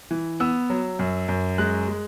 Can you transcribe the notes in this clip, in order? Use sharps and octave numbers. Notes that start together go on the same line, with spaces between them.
E3
B3 E6
F#3
F#2
F#2
G#3 F#6
G#3